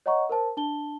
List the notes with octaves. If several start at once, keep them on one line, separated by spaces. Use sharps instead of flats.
C#5 D#5 F#5 A#5 C#6
A#4 C5 A5
D4 A5 G7